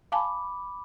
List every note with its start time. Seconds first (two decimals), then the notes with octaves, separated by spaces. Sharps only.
0.12 F5 G#5 A5 B5 D6